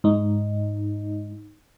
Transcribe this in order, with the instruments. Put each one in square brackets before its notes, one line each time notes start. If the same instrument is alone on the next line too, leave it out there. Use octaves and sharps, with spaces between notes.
[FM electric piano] G#2 D#4